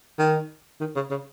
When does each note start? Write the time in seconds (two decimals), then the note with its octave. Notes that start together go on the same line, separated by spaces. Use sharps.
0.19 D#3
0.80 D#3
0.96 C#3
1.10 C#3